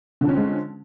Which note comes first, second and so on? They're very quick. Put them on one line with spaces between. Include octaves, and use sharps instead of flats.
D3 F3 C#4 C4 G#3